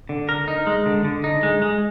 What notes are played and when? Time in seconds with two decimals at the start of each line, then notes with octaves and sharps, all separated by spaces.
0.09 D3
0.29 A#4
0.48 D#4
0.67 G#3
0.86 D3
1.04 D3
1.24 D#4
1.43 G#3
1.62 G#3